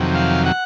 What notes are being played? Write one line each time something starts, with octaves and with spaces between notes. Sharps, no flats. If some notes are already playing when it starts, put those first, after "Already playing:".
Already playing: F2 C3 D#3 F#3
F5
F#5